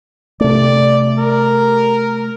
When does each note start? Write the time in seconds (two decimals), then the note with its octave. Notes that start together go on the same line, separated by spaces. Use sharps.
0.40 C3 A3 D5
1.18 A#4